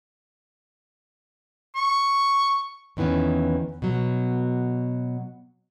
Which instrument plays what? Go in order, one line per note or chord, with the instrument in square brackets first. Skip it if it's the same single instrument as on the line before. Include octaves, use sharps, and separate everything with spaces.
[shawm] C#6
[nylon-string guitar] E2 D#3 E3 B3 C#4
B2 F#3